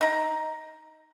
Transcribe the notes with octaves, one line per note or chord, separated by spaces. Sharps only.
D#4 A#5